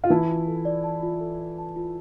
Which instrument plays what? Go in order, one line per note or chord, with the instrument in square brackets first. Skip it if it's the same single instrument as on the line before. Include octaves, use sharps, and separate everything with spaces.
[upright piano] F4
[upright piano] E3 E4 [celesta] A5
[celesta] F4
A4
D5
A5
F4
A4
D5
A5
F4